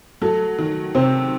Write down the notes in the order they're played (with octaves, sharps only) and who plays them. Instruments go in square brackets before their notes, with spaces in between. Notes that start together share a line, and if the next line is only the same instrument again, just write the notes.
[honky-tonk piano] F#3 [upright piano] A3 A4
[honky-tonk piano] D#3
[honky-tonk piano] C3 [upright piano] C4 C5